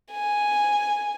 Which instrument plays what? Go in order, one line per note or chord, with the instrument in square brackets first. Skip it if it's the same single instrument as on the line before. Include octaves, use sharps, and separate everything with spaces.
[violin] G#5